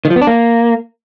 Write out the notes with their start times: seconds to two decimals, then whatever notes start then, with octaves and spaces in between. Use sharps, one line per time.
0.05 D#3
0.10 F3
0.16 B3
0.22 D4
0.27 A#3